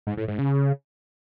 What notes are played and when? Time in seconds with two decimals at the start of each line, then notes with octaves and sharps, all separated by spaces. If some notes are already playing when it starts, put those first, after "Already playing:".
0.07 G#2
0.17 A2
0.28 G#2
0.38 C#3